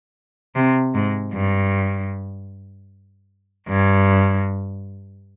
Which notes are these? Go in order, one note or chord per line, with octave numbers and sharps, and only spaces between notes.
C3
G#2
G2
G2